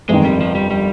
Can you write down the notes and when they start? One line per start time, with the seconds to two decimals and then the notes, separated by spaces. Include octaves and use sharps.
0.09 G1 F2 D#3 G#3
0.24 G3
0.41 F3
0.55 G3
0.71 G3